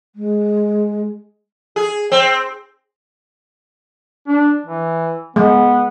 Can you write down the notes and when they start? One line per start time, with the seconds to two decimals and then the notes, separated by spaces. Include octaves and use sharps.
0.15 G#3
1.76 G#4
2.12 C4
4.28 D4
4.66 E3
5.36 G#3 B3